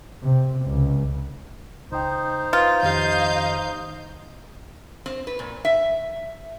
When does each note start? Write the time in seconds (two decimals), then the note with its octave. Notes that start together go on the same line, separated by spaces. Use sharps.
0.24 C3
0.66 C#2
1.92 C#2 D#4 C5 G5
2.53 F4 B4
2.83 F2 D#3 G4 D#5 F5 G6
5.06 C4
5.27 B4
5.39 A#2
5.65 E5